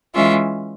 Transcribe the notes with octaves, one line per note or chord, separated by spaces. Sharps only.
E3 G#3 C#4 F4 E5